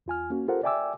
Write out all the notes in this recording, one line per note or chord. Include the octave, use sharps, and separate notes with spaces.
E2 F4 G#5 F6
A#3 C#4 F#4
F4 G4 A4 A#4 C5 F#5
D5 E5 G5 G#5 D6 E6